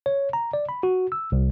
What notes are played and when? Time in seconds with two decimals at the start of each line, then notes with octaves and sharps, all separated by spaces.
0.06 C#5
0.33 A#5
0.53 D5
0.69 B5
0.83 F#4
1.12 E6
1.32 C2